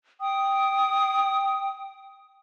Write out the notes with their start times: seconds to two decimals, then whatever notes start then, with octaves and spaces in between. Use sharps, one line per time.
0.21 G5 D#6